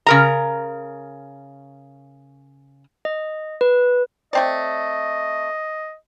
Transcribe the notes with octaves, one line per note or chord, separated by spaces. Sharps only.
C#3 A#4 A#5
D#5
B4
A3 C4 D5 D#5